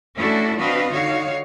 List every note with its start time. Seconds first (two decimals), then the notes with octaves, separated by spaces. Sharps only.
0.17 A3 C#4 D4 E4 F#4 A4
0.58 C4 D4 F#4 B4 D#5 F5
0.91 D3 D#4 F#4 C#5 F5